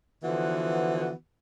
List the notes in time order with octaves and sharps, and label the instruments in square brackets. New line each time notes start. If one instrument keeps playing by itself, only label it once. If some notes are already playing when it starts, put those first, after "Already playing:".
[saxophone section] D3 E3 F3 B3 F#4